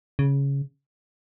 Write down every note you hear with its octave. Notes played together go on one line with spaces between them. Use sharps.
C#3